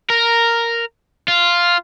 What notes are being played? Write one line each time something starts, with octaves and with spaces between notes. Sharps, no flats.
A#4
F4